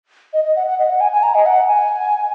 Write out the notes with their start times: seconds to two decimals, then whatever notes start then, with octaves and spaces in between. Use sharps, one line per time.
0.34 D#5
0.45 D#5
0.56 F#5
0.67 F#5
0.79 D#5
0.90 F#5
1.01 G#5
1.12 G#5
1.23 A#5
1.35 D#5
1.46 F#5
1.68 G#5